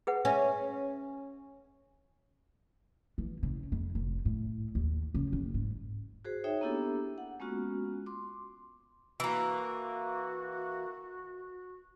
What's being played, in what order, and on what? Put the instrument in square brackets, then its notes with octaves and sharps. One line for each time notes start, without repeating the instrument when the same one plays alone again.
[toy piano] G#4 B4 F#5
[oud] C#4 [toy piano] B4 E5
[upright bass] E3
C#3
F2
F1
A2
D#2
C#3
F#1
G#2
[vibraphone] F#4 G#4 C5
D#4 G#4 C#5 E5 G5
A#3 B3 D4 E4 G4 A4
F#5
G#3 A#3 B3 C#4 F4 F#4
C6 D6
[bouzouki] E3 A#3 [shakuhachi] F#4